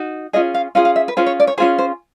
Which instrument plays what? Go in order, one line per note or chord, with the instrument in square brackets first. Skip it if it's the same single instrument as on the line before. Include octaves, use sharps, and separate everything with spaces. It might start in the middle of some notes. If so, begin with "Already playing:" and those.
Already playing: [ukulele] D#4 F#4
C#4 F4 G#4 D#5
F5
C#4 F4 G#4 F5
F5
E5
B4
C#4 F4 G#4 C5
C#5
D5
C#5
C#4 F4 G#4 C5
C5